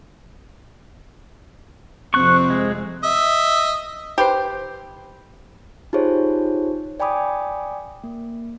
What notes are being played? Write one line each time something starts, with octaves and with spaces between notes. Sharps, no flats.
F2 C3 C4 C#6 F#6
G#3
D#5 E5
G4 B4 C5
D#4 F4 G4 G#4 C5 C#5
D5 G5 G#5 B5 D6 D#6
A#3